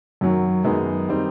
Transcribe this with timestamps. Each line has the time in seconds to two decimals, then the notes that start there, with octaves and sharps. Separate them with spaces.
0.21 F#2 D#3 F#3
0.64 F#2 D#3 G#3 B3 D#4
1.09 D#3 G3 C4 D#4